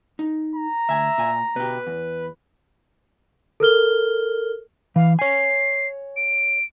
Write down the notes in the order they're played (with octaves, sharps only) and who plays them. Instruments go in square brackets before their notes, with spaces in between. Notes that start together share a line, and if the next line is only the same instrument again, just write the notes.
[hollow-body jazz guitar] D#4
[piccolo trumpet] A#5
[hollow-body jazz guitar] D2 G#5 [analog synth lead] E5
[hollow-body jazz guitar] A#2 G#5
[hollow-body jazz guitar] B2 G4 [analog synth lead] B4
[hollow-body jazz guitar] E2
[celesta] A4 A#4 F6 G7
[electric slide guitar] E3 [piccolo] F5
[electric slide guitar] C#5 G#5 [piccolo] C7
[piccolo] D7